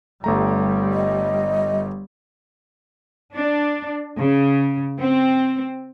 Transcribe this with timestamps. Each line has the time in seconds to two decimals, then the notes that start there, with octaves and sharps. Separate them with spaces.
0.24 G1 G3 A3 A#5
0.93 D#5
3.35 D4
4.19 C#3
5.00 C4